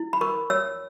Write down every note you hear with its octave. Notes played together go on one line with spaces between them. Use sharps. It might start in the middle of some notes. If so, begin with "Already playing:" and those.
Already playing: E4
B5
A#4 C#6
C#5 E6